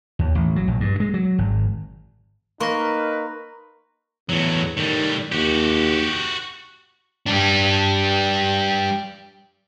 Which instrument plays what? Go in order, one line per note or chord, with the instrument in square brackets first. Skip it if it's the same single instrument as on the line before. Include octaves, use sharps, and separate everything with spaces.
[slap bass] D#2
A1
F#3
A#1
G2
G#3
F#3
G#1
[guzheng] A#3 [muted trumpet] D#4 [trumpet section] A#4 B4 [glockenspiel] C6 C#6 A#6
[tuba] E2 [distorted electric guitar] A2 F#3
[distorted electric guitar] A2 G3 [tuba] D#3
[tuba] D#2 [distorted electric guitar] F#4 G4
[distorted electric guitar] G3 D4